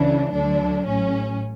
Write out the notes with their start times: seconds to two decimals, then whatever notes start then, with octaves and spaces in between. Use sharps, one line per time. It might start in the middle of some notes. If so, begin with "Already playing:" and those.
Already playing: C#2 C#3 E3 D4
0.32 D2 D3 F#3 D4
0.86 A1 A2 F#3 C#4